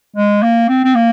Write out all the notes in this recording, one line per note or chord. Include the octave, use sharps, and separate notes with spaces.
G#3
A#3
C4
C4
A#3